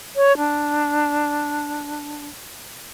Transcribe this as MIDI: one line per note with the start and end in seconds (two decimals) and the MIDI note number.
0.16 0.36 73
0.38 2.27 62